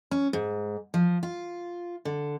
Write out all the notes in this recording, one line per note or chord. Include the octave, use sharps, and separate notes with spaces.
C#4
G#2
F3
F4
D3